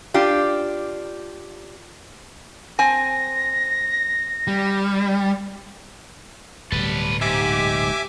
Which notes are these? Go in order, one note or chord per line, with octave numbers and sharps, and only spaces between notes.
D4 F4 G4
C4 G#5 A#6
G3
D1 B2 G3 A4 B4
G#2 G4 E5 G#5 D6